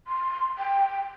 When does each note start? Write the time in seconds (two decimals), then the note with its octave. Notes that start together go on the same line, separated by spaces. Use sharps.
0.07 C6
0.58 G5